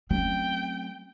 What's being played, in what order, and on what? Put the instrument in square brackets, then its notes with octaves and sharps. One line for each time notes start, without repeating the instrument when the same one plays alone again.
[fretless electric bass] F#3 A3 C#4 [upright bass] C4 [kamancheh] G5